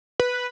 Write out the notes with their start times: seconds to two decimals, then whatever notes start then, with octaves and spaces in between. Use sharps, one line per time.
0.20 B4